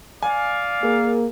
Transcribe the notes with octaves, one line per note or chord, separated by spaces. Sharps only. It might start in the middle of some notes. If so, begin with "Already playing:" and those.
D5 F5 G#5
A#3 G#4 A#4